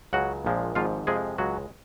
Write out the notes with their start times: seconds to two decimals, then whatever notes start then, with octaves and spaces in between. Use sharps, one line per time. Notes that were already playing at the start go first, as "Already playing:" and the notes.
0.13 C#2 C#3 F#3 F#4 F#5
0.45 A#1 A#2 F3 G#3
0.75 G#1 G#2 F3 F4 F5
1.07 F2 C3 F3 G#3 G#4
1.38 C#2 C#3 F#3 G#3 F#4